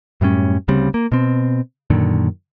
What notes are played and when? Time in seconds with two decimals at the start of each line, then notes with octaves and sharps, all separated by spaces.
0.21 F#2 A2 G3 C#4
0.68 D2 C#3 G3 C4
0.94 A#3
1.12 B2 C4
1.90 F#2 A#2 D3 D#3